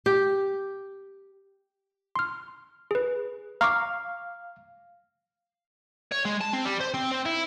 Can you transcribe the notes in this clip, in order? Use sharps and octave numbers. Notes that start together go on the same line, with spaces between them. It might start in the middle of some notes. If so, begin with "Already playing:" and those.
G4
C6 F6
G#4 B4
F5 A#5 C#6 D6
C#5
G#3
A5
C4
G3
C5
C4
C4
E4